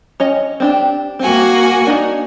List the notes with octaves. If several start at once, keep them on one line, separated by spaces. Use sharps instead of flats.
C#4 C#5 D#5
C4 D4 G4
A#3 C4 F#4 G#5
D4 D#4